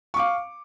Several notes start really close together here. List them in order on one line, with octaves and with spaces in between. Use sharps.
C#6 D6 F5